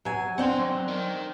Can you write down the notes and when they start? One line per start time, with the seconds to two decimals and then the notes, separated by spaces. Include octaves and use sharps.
0.05 F#3 G#5
0.38 C4 D4 F#5 G5 C6
0.58 F#3
0.88 A#4 D#5